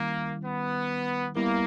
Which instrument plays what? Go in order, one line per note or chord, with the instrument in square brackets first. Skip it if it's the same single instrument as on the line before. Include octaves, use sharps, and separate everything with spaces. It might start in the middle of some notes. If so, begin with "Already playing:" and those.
Already playing: [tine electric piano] D#3 G3 C#4 E4 [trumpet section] A#3
[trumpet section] B3
[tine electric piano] G3 B3 E4 A#4 [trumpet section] A#3